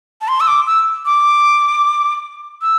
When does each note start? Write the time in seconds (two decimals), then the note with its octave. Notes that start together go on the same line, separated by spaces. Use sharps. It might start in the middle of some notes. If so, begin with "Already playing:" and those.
0.21 A5
0.28 C6
0.41 E6
0.47 D6
0.67 E6
1.05 D6
2.62 E6